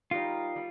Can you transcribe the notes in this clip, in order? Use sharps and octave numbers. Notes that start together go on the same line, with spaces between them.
G3 D#4 F4 G4 A#4
G3